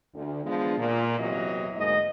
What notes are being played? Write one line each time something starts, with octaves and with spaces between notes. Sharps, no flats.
D2
E3 F3 G#3 B3 D4
A#2
E2 C3 E3 F#3 D#5
D2 G#2 G#3 A#3 D#5